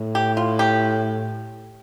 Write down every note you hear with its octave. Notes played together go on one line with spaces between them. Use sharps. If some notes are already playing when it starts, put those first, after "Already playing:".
Already playing: A2
G4
F4
G4